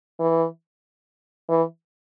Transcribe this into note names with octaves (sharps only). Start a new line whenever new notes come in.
E3
E3